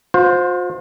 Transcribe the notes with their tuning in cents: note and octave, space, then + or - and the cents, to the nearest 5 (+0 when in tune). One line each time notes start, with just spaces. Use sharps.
F4 +45 C5 +0